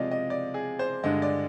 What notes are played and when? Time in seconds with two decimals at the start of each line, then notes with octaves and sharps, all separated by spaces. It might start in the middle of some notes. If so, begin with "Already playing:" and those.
Already playing: C3 F3 G#3 D5 D#5 F5
0.11 D#5
0.30 D5
0.54 G#4
0.79 C5
1.04 G2 D3 G#3 D#5
1.22 D5